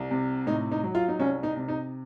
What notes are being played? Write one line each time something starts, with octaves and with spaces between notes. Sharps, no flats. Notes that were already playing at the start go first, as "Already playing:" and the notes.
Already playing: C2
C3
A2 D#4
D#4
F#3
F4
D#4
C2 C#4
D#4
C3
D#4